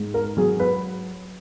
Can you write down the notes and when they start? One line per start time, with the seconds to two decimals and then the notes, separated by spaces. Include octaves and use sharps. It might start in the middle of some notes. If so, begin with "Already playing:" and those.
Already playing: G#2
0.14 A#4
0.37 F#3 G#4
0.60 B4